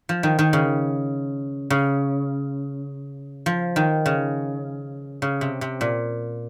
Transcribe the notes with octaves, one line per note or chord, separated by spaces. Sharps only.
F3
D#3
D#3
C#3
C#3
F3
D#3
C#3
C#3
C3
C3
A#2